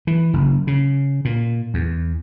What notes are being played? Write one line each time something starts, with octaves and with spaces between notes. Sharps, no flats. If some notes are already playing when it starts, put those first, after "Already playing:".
E3
F#1
C#3
A#2
E2